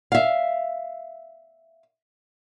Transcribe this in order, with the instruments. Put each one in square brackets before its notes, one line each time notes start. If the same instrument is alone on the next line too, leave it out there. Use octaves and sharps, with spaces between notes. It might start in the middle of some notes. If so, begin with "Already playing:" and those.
[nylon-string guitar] E5 F5